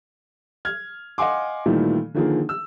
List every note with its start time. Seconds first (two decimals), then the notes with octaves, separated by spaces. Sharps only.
0.65 F6 G#6
1.18 D#5 F5 F#5 G#5 C6 D6
1.66 A#2 D#3 E3 G3 A3
2.14 D3 D#3 F3 A#3 G#4
2.49 E6